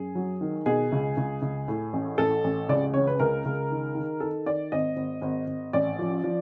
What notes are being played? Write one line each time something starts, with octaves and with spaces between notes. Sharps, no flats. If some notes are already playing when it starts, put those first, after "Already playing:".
Already playing: F#2 G#4
F#3
D#3
B2 G#4
C#2
C#2
C#2
A2
A1
A1 A4
A1
C#2 D5
C#3 C#5
B4
C#2 A#4
C#2
D#3
D#3
D#3 A4
D#3 D5
G#1 D#5
G#1
G#1
G#1
A1 D5
F3
F3